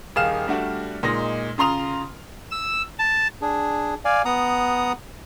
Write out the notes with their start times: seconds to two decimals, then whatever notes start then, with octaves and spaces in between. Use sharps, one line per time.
0.16 D#1 D#3 G#4 F5 F6 E7
0.48 G3 A3 D4 F#4
1.03 A#2 G#3 D#4 A#6
1.58 C#3 F4 A#5 C6 D#6 F7
2.51 E6
2.99 A5
3.42 D4 G#4
4.05 D5 F5 G#5
4.25 B3 F#5 A#5 D#6